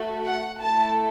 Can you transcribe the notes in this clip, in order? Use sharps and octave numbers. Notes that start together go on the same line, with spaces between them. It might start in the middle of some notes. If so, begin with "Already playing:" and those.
Already playing: A3 F#4 A4
F#5
A3 E4 A4 A5